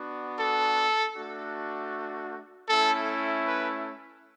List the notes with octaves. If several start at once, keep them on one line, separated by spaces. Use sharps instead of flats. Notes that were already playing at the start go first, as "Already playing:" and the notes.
Already playing: B3 D4 F#4
A4
A3 D4 F#4
A3 C#4 E4 A4
B4